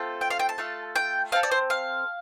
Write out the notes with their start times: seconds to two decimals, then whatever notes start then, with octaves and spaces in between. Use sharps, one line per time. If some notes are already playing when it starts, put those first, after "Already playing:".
Already playing: A3 C4 F4 A4
0.21 G5
0.30 F5
0.39 G5
0.49 A5
0.58 A3 F4 A4
0.96 G5
1.32 C4 A4 F5
1.43 D5
1.51 C5
1.70 F5